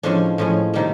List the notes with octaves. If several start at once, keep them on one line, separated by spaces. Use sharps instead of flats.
A2 F3 G#3 C#4 D4
A2 F3 G#3 C#4
C3 D#3 G3 A#3